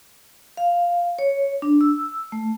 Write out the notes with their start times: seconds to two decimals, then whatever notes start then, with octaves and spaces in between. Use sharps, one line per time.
0.57 F5
1.19 C#5
1.62 D4
1.81 E6
2.32 A3